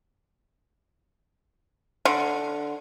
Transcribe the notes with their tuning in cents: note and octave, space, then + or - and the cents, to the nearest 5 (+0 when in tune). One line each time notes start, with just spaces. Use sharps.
D3 +0 C6 +30